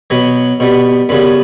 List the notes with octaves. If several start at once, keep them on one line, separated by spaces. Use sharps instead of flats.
B2 F#3 B3 B4
B2 G3 B3
F#2 C#3 G3 B3 B4